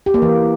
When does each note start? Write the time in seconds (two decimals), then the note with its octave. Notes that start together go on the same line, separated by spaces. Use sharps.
0.06 G4
0.14 A#3
0.22 E3